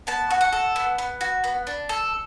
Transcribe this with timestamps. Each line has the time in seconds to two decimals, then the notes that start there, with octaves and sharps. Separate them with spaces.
0.07 B3 A5
0.31 F#4
0.41 F#5
0.53 A4
0.76 B3
0.98 B3
1.21 F#4
1.44 B3
1.67 D4
1.89 A4